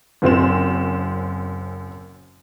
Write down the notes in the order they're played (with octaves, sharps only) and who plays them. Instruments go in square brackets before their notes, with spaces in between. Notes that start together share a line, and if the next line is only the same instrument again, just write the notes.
[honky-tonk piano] F#1 F#2 C4 E7